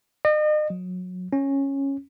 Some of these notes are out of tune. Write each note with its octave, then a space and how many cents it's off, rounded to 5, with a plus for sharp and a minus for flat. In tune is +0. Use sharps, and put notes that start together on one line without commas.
D#5 -40
F#3 -25
C#4 -10